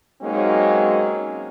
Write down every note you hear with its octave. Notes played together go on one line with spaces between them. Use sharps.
F#3 G#3 A#3 C4 C#4 D#4